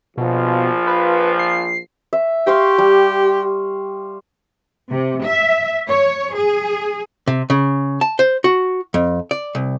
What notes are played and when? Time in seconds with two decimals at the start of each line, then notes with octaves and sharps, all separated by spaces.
0.17 A#1 B2 F3
0.87 B4
1.39 C7
2.13 E5
2.47 G4 F5 C6 C#6
2.78 G3
4.90 C3
5.25 E5
5.89 C#5
6.35 G#4
7.27 C3
7.50 C#3
8.01 A5
8.19 C5
8.44 F#4
8.94 F2
9.31 D5
9.55 C2